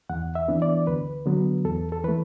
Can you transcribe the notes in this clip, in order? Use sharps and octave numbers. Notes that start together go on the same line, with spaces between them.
E2 F#5
E5
E3 B3 D4
D5
D2 B4
D3 F#3 B3
E2 A4
A4
E3 A3 B4